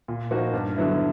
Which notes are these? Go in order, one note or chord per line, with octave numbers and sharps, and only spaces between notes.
A#2
F3 A#3 D#4 F#4
G2
D3 F#3 B3 E4